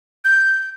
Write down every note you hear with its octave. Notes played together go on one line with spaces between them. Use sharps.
G6